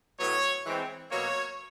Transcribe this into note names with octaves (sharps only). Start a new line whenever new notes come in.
A2 F#3 B3 C#5
E3 G#3 C4
B2 F#3 A#3 C#5